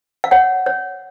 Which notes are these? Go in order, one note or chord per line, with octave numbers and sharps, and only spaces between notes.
F5
C#5 F#5
C#5